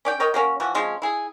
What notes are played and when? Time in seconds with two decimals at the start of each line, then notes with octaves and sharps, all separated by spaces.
0.05 C#4 D5 G5
0.20 A#4 C#5 D#5 G5
0.34 F#3 A#3 C#4
0.60 E3 F3 F#4
0.75 F3 G#3 C4 C#4
1.02 E4 G#4